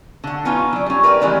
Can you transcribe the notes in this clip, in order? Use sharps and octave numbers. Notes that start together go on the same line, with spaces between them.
D3 F#5
B3 C#4 D#4 F4
F#3 D5
G3 C#4
A#4 B4 D5 E5 G5
D#3 E3 G3 G#3 C4 D#4